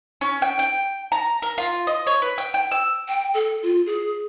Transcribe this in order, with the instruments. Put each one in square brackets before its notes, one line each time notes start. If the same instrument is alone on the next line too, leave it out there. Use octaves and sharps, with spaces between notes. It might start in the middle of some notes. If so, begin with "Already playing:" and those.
[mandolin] C#4
G5
G5
A#5
A#4
F4
D#5
C#5
B4
G5
G5
E6
[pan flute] G5
A4
F4
G#4